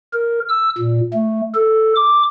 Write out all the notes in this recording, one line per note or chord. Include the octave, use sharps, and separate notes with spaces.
A#4
E6
A#2
A3
A4
D6